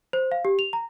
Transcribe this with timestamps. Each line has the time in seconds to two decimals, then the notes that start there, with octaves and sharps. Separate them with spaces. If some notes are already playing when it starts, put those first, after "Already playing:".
0.13 C5
0.32 F5
0.45 G4
0.59 F7
0.73 A#5